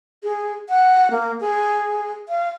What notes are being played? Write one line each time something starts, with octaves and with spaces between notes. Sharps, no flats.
G#4
F#5
A#3
G#4
F5